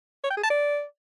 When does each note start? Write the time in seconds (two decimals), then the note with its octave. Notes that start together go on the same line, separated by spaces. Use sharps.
0.24 C#5
0.30 G5
0.37 G#4
0.43 A5
0.50 D5